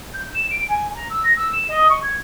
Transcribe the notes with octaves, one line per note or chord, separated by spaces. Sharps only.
G6
E7
D7
G#5
A#5
E6
A#6
E6
E7
D#5
C#6
G#6